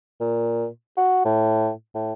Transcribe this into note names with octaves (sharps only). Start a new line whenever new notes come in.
A#2
F#4
A2
A2